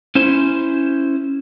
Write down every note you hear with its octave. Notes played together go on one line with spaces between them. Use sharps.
C#4 E4 C5